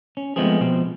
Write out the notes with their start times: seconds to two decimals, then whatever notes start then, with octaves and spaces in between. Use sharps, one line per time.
0.17 C#4
0.36 F3 G#3 A3 B3 C4 G#4
0.60 B2 F3 C4